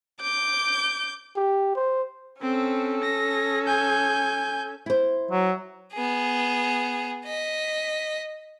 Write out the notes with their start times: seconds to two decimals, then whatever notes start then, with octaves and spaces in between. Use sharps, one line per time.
0.21 D6 G6
1.36 G4
1.75 C5
2.42 C4 C#4 A4
3.04 A#6
3.67 G#5 G6
4.86 E4 C5
5.31 F#3
5.93 B3 G#4
7.25 D#5 B6